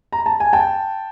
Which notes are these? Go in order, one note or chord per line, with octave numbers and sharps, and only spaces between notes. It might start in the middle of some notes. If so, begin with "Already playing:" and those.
A#5
A5
G#5
G5 A5